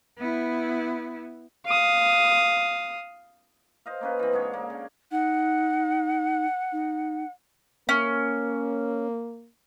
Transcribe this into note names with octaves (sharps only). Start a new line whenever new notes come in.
B3 E4
F5 D#6
C5 D#5 F5
A#3 C#4 B4
E3 C4
G#2 D3 G#4 C#5
A#3
C#3
D#4 F#5
D#4
A#3 C#4